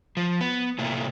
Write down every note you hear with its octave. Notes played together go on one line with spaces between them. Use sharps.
F3
B3
A2 C3 A3 A#3